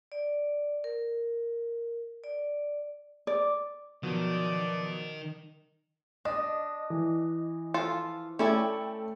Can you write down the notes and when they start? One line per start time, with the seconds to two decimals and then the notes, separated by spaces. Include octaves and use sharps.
0.12 D5
0.84 A#4
2.24 D5
3.27 D5
4.03 B2 D#3 F3 F#3 D5
6.25 D4 D#5
6.90 E3
7.74 F3 F4 A4
8.39 A3 C#4 E4 A4 D5 G5